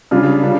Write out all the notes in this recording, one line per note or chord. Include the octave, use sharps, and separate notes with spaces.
C#3 G3 D4 F4
C#3 G3 D4